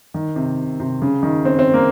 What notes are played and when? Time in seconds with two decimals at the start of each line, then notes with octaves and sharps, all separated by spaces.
0.14 D#3
0.36 C3
0.80 C3
1.02 C#3
1.23 D#3
1.45 C4
1.59 C4
1.74 A#3